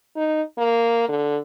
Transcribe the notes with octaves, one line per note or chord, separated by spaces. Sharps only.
D#4
A#3
D3